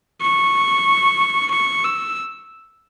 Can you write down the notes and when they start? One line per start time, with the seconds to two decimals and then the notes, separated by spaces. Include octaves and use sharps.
0.21 C#6
1.51 C#6
1.84 E6